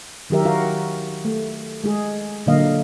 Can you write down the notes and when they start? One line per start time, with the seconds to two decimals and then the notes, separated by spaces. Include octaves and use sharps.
0.30 D#3 F#3 G4 A#4 E5
0.45 F#4 A#4 F5
1.25 A3
1.84 G#3 G#4
2.46 A#2 D3 F#3 A#3 D#5 F5